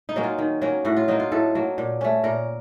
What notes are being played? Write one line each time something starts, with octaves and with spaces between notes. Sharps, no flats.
D#4
F#3 A#3 C#4
F4
D#3
F#3 A#3 C#4
A2 F#4
F4
F#3 A#3 D#4
F4
A2 A4
F#3 A#3
A#2
A3 C#4
A#2 A#4